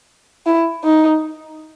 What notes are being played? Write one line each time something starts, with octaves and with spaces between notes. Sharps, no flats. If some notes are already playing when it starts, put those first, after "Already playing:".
E4
D#4